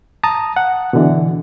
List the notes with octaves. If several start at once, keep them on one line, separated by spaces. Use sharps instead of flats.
A5 A#5 D#6
F#5
B2 D3 E3